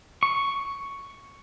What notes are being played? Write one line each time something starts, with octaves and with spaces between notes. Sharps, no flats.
C#6